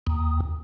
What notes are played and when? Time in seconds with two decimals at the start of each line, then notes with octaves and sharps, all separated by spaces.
0.07 D#2